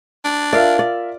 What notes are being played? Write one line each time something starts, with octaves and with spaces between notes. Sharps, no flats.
D4
F4 A#4 D5 E5 F5
D5